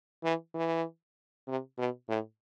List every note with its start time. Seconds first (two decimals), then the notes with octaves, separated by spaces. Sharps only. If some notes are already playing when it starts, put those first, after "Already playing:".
0.24 E3
0.55 E3
1.48 C3
1.78 B2
2.09 A2